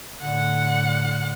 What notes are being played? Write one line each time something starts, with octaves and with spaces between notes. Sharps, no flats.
A2 D3 F#5